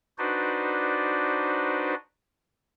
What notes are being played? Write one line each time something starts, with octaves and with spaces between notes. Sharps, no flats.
D4 D#4 F#4 B4 C5 D5